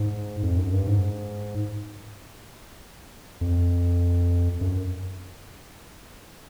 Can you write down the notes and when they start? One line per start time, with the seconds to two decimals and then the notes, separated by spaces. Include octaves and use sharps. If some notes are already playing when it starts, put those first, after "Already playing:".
Already playing: G#2
0.43 F2
0.57 F#2
0.73 G2
0.87 G#2
3.41 F2
4.61 F#2